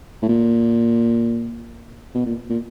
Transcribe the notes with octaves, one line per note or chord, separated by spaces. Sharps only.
A2
A#2
B2
A#2
A#2